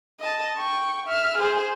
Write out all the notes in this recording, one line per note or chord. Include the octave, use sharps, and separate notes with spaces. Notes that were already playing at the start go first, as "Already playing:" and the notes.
D#5 A5
G5 C#6
E5 F6
G#4 C5